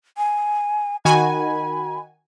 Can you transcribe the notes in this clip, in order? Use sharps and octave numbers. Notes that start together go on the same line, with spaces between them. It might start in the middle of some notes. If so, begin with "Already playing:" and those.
G#5
D#3 F#4 G#5 B5